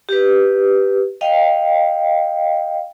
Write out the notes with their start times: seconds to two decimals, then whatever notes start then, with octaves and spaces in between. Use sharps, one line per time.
0.09 G4 B4
1.21 D#5 F5 G5